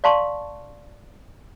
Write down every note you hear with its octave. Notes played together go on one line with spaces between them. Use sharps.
D5 F5 A5 C6 C#6